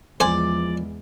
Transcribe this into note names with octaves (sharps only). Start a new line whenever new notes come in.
E2 F3 G#3 C5 D5 G#5